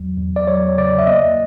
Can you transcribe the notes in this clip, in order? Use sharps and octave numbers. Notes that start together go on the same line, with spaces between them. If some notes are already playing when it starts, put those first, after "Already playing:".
Already playing: E2 F#3
E2
D5
F#3 C#5
C#3 D5
E5
A#3 D#5